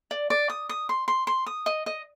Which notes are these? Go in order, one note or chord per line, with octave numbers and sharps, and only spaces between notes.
D5
D5
D#6
D#6
C6
C6
C6
D#6
D#5
D#5